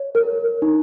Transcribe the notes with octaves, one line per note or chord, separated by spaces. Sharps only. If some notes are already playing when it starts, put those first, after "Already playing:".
Already playing: C#5
A#4
D#4